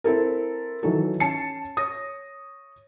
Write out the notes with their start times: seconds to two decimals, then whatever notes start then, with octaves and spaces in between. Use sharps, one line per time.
0.04 C4 E4 A4 A#4
0.83 D#3 E3 F#3 A4
1.20 C#4 A5 C7 C#7
1.77 C#5 D#6 A#6